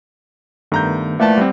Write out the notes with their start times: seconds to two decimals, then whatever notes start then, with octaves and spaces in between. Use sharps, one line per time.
0.72 G2 D#3 A3 B3 A#5 G6
1.20 E3 F3 A3 A#3 D5 F#5 A5
1.38 G3 C4